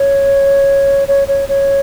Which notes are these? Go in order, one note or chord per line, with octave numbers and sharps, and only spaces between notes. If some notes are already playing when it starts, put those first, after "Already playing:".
Already playing: C#5
C#5
C#5
C#5